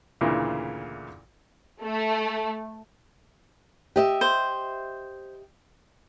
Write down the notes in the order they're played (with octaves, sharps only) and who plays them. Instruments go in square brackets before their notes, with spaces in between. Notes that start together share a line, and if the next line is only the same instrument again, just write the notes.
[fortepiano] D2 A#2 C#3 E3
[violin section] A3
[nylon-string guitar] G4 D#5 E5
[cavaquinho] C5